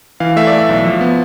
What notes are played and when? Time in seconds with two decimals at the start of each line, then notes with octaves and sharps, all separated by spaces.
0.20 E3 F5
0.36 A3 E5
0.47 D5
0.52 A3
0.58 E5
0.69 B1
0.85 F3
1.01 B3